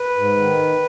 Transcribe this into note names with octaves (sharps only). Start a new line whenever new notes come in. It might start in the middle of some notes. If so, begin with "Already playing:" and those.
Already playing: B4
G#2
D#3